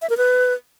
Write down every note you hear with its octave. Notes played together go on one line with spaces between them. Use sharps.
E5
A#4
B4